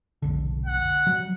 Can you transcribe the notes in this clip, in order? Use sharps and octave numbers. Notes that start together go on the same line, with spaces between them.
F1 B1 D3
F#5
F#3 G3